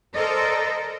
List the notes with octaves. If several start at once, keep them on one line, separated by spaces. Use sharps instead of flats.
A4 A#4 C5 D5 D#5